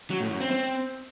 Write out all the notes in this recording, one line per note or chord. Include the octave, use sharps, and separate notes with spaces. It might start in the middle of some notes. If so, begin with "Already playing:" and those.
F#3
A2
F#2
C4
C4